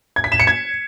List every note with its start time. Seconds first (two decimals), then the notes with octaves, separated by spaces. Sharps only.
0.16 G#6
0.24 B6
0.32 E7
0.40 C#7
0.47 G#6